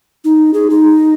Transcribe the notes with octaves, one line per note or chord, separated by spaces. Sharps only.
D#4
G#4
D#4